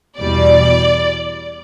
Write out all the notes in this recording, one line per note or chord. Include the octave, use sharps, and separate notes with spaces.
E2 B2 G3 D5